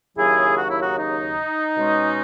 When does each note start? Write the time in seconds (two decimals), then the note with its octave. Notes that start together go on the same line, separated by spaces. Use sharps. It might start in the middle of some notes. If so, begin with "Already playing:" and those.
0.16 D#2 C#3 F#3 E4 G#4
0.57 F#4
0.70 E4
0.82 D#4 F#4
0.98 D#4
1.77 B2 G#3 C#4